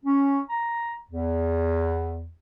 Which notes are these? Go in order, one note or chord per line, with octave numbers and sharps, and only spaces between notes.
C#4
A#5
E2